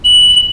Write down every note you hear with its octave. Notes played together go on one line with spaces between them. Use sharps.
F#7